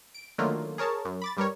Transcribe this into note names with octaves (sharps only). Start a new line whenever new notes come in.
D7
D3 D#3 F#3 A3 A#3 F4
G#4 A#4 C#5 A5
F#2
B5 D6 A6
G2 G3 A#4 C#5